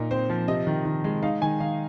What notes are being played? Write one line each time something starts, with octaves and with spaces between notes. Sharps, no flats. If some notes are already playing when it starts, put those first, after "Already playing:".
Already playing: A#2 D#4 A#4
C4 C5
F3
C3 D#5
D#3
D#3
G#3
D#4 F5
D#3 G#5
D#3 F5